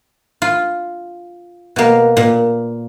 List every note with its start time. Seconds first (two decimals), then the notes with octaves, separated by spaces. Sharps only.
0.42 F4
1.76 B2 A#3
2.17 A#2